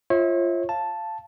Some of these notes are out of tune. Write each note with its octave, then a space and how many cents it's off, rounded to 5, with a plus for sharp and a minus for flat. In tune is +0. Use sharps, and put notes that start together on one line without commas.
F4 -15 C#5 -40 E5 -35
F5 -15 A5 +0